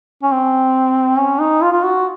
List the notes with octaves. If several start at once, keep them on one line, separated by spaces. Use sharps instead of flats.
C#4
C4
C#4
D#4
F4
F4
F#4